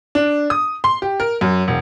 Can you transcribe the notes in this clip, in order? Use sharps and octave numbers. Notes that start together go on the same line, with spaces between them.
D4
D#6
C6
G4
A#4
F#2
E1